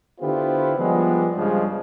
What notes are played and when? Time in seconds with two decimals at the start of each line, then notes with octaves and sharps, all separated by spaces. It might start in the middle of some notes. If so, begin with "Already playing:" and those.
0.20 D3 B3 E4 F4 G4 C5
0.78 F3 G3 G#3 B3
1.35 G2 C#3 F3 G#3